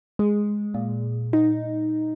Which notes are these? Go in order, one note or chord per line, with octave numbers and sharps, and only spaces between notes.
G#3
A#2
D#4